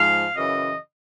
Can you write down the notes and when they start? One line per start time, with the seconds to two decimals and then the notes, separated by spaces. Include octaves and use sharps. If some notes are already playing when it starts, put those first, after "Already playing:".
Already playing: G#2 F3 F5
0.35 F#2 C#3 E3 D#5